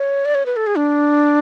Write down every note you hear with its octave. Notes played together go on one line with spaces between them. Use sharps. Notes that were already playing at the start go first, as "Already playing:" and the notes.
Already playing: C#5
D5
C#5
B4
A4
G#4
D4